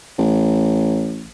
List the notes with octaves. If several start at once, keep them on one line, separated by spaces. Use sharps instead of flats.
A1